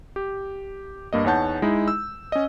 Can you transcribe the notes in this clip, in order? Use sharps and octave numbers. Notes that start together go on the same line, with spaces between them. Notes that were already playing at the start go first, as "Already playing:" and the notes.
G4
G2 A#3 D#5
E2 D#4 C#5 F#5 A5 G6
G#3 D#4 E4
E6
C#4 D#5